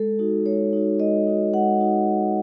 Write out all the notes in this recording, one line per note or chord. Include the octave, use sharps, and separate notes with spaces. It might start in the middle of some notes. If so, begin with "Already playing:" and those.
Already playing: G#3 A4
D#4 F#4
G#3 C#5
D#4 F#4
G#3 D#5
D#4 F#4
G#3 F#5
D#4 F#4